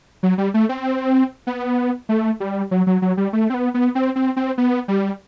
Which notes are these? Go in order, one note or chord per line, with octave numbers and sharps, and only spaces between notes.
F#3
G3
A3
C4
B3
A3
G3
F#3
F#3
F#3
G3
A3
C4
B3
B3
C4
C4
C4
B3
G3